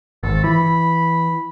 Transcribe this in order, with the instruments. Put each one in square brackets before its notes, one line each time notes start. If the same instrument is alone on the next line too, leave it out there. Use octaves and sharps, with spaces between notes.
[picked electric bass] G#1 [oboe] A4
[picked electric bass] E3 [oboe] B5